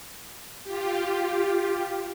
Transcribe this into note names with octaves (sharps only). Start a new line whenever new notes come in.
F4 G4